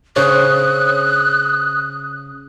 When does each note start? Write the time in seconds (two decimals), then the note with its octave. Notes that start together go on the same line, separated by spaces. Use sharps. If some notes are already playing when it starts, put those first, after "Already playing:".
0.16 C#3 C5 C#5 D#6 F#6